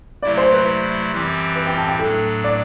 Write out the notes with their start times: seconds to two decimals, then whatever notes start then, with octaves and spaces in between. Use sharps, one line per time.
0.23 C3 F#3 A3 E4 D5
0.37 C5
0.52 B4
1.12 F#2 E3 G3 C4 G4
1.56 B4
1.66 G5
1.78 A5
1.88 G5
1.99 A2 F#3 A3 D4 A4
2.44 D5